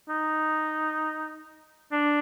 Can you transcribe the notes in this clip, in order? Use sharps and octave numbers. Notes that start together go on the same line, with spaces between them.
D#4
D4